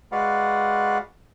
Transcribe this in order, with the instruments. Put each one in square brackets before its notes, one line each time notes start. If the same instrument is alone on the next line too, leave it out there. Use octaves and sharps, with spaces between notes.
[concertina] G#3 F#4 B4 D5 F5 F#5